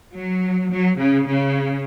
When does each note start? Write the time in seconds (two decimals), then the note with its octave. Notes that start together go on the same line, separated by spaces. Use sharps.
0.13 F#3
0.70 F#3
0.98 C#3
1.26 C#3